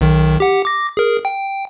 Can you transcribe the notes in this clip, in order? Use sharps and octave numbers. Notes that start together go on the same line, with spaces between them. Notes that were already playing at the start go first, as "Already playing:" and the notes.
B1 D#3
G4 F#5
D6 A#6
G#4 A#4
G5